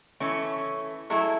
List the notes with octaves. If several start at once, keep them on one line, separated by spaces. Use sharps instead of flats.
E3 A3 C#4
F#3 A3 E4 G#4